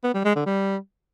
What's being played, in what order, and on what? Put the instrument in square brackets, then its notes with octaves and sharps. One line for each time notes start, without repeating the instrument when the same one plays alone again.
[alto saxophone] B3
G3
G#3
D3
G3